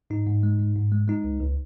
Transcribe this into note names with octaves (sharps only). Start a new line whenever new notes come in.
G#2 D#4
G#2
G#3
G#2
G#2
G#3
G#3 D#4
C#2
C#2